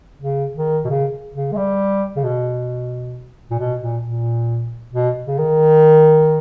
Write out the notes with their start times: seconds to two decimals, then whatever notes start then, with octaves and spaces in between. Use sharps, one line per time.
0.21 C#3
0.56 D#3
0.85 B2
0.89 C#3
1.34 C#3
1.52 G#3
1.57 G3
2.16 C#3
2.24 B2
3.50 A#2
3.59 B2
3.81 A#2
4.03 A#2
4.94 B2
5.27 C#3
5.39 D#3